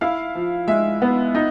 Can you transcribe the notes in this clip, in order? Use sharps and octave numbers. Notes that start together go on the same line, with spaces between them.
E4 F5
F3
G#3 E5
B3
D#4